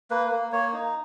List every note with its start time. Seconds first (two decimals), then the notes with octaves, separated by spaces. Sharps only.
0.10 A#3 B4
0.32 A#3
0.52 A#3 C#5
0.73 D#4